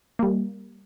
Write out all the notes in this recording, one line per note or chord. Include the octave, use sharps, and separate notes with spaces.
G3 A#3